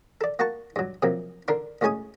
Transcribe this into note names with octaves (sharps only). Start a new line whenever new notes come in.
A4 D5
A#3 F#4 F#5 A5 C#6
G2 F#3
C3 F3 F#3 A#3
D3 D4 A#4 C6
D2 A2 G#3 C#4 G#5 D#6